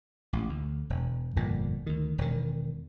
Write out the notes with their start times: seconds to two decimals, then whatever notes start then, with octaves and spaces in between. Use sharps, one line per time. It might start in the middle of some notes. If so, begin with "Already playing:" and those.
0.33 A1
0.49 D2
0.90 E1
1.36 G1 F2 A#2
1.86 D2 D#3
2.18 E1 D#3